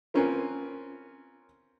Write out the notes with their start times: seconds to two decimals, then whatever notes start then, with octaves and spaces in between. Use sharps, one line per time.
0.14 A#3 C4 C#4 F4 A#4 B4